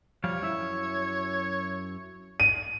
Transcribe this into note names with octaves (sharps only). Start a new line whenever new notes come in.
F3 G3 C#5 F5
F#2 E4 E5
D#7